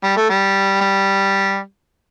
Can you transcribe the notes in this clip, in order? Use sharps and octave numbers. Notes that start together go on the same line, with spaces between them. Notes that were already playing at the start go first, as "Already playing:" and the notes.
G3
A3
G3
G3